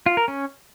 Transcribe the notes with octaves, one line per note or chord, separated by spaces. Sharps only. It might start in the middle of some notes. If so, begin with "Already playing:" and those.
F4
A#4
C#4